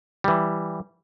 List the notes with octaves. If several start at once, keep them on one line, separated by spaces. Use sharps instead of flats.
E3 G3